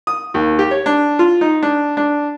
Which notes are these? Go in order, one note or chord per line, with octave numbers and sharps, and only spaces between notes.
D#6
D#2
G4
C#5
D4
F4
D#4
D4
D4